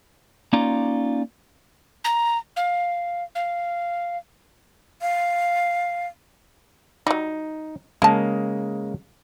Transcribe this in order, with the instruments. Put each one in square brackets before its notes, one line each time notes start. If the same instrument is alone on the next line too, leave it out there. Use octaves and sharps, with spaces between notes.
[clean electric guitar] A#3 C#4 D#4 F4 D5 A#5
[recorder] A#5
F5
F5
[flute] F5
[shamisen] F#3 G3 [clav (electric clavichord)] D#4
[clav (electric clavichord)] C#3 G#3 A#3 [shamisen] A#4 A5